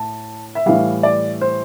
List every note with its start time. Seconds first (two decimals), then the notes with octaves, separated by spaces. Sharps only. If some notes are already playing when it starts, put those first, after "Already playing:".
Already playing: A2 A5
0.55 E5
0.66 A2 E3 G3 F5
1.03 D5
1.41 C5